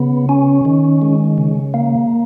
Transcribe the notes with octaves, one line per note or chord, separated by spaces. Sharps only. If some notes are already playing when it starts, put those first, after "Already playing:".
Already playing: C#3 B3
C#4
D#3
G#3
C#3
A#3